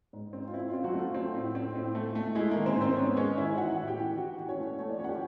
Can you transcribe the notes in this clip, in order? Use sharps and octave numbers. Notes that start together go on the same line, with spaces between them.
G#2
C4
F4
C4 E4
C4 F4
F#3 F#4
A3
F4
C4
A2
C4
A2
A3
A3
G#3 E4
D#3 A#3 A#4
C4 C5
G#2
C4 C5
B3 C#4 C#5
G#3 C#4 C#5
D#3 E4 E5
E3 F#4 F#5
A2
G4 G5
E3
E3 F#4 F#5
E3
C#4 C#5
A3
A3 C#5
D5
F3 C#4 C#5
F#5
G4 G5